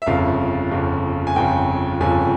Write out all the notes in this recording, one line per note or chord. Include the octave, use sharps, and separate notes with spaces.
E5
G1 F2 C#3 F5
G1 F2 C#3
G#5
G1 F2 C#3 G5
G1 F2 C#3 G#5